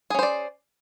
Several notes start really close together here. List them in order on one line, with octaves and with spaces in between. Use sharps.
G#4 C#4 C5 D5